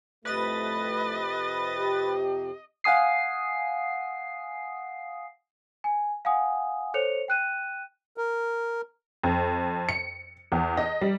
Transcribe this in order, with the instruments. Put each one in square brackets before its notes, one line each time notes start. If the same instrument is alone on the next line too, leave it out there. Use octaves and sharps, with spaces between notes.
[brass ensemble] C2 A3 [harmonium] F2 C3 [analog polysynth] B4 A6 [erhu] D#5
[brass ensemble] G4
[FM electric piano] F5 F#5 G#5 D#6 C7
[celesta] G#5
F5 F#5 G#5 D#6
A4 C5 C#5 C#7 F7
G5 F#6 D#7
[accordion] A#4
[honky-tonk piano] F2
C#7
E2
D#5
G3